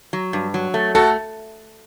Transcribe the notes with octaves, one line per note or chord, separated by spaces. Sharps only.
F#3
G2
F#3
A3
A3 F#4 A4